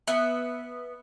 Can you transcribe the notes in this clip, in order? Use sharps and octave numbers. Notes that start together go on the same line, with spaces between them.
B3 E5